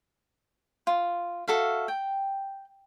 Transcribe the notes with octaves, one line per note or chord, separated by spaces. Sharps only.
F4
F#4 A4 E5 F5
G5